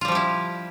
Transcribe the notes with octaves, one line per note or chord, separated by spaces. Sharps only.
F3 G3 E4 F4 G4